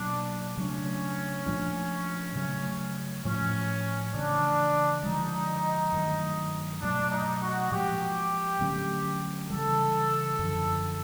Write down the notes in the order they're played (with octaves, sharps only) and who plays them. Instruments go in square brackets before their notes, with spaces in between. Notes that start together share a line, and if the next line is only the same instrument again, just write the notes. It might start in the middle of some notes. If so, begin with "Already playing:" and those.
Already playing: [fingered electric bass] B2 F#3 A#3 [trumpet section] D4
[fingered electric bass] C#3 F#3 A3 D4 [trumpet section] C#4
[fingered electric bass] A#2 F3 A3 D4
C#3 F#3 A3
[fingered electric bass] A2 F3 A3 [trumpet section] C#4
[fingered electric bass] C#3 E3 A3 [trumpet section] D4
[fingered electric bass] D3 F3 G#3 [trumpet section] D#4
[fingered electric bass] G2 D#3 F#3 A3
[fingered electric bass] B2 F#3 A3 [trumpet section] D4
[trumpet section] D#4
F#4
[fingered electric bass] A#2 F3 G#3 [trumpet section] G4
[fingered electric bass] D3 F#3 A3 C#4
[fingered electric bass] C#3 E3 G3 [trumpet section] A4
[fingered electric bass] F#2 D3 F3